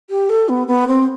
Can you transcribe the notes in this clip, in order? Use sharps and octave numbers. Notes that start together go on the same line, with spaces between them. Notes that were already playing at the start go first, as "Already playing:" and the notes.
G4
A4
B3
B3
C4